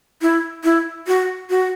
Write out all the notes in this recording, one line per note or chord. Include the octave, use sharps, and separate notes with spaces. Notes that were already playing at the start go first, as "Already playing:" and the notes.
E4
E4
F#4
F#4